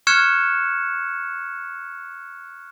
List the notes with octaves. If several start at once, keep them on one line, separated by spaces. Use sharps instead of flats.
C#6 F6 F#6 G#6 C#7 E7